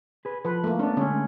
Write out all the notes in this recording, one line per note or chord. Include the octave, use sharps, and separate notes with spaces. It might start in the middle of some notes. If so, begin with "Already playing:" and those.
G#4 B4
F3 A4 B4
A3 A#3
B3 C#4 D4
D3 G#3 A3 C#4